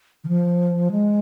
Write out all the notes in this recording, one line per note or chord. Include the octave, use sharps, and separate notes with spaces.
D#3
F3
G#3